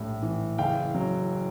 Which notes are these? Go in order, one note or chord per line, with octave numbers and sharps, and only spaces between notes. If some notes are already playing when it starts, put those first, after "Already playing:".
Already playing: A#1 A2 G3
E3
F#1 F5 G5
F#3